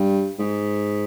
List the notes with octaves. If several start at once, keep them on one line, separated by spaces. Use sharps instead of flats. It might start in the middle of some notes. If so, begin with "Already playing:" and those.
Already playing: G2
G#2